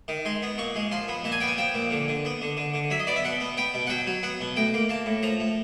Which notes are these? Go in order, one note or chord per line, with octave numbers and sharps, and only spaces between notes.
D#3
G#3 C6
B3
A#2 C#6
G#3
F3 C6
B3
A#2 A5
G#5
B3 G5
G#5
F3 G5
A#2
D3
D3
B3
D3
D3
D3
F#3 E5
D#5
B3 D5
E5
B2 F#5
B3
B3 G5
B2
F#5
F#3 G5
F#3
B3 F#5
B2
A2 G5
A#3
A#3 A5
A2
F3 A#5
A2